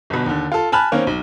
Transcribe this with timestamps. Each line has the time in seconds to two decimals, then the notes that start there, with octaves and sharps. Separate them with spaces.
0.10 G1 B2
0.26 D#2 D3
0.52 F4 A4
0.72 G#5 A5 B5 F6 F#6
0.92 D#3 A#3 C4 C#4
1.07 B1